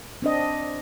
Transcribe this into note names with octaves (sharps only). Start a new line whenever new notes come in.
C4 D4 D#5